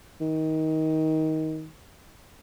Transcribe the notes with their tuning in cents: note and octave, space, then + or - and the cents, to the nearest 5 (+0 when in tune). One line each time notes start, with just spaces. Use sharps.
D#3 +20